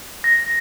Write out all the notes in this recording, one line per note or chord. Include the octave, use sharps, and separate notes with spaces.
A#6